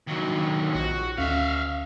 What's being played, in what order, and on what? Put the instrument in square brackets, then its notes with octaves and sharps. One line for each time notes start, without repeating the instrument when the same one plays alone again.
[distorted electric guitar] D#2 F#3
[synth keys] A#1 [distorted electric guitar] F#4
[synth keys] D2 [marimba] C#4 [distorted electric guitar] E5 F5